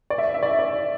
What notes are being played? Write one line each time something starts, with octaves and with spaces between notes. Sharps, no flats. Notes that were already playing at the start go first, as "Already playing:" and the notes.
D5
E5
E5
D5
D5